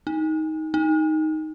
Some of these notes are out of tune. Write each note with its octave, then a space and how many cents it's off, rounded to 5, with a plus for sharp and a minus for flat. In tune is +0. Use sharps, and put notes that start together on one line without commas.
D#4 +15
D#4 +5